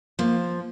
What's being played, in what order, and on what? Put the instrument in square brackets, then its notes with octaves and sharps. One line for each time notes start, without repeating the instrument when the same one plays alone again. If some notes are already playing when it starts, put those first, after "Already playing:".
[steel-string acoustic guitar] F3 [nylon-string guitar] A#3